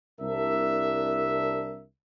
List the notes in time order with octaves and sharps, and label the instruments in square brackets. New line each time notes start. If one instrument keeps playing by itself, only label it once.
[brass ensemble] C2 D4 A#4 E5